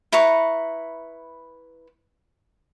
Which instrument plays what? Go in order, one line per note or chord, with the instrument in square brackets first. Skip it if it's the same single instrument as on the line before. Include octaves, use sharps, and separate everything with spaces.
[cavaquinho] E4 B4 A#5 C#6